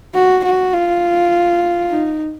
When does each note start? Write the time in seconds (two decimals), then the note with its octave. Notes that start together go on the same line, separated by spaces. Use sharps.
0.14 F#4
0.44 F#4
0.73 F4
1.91 D#4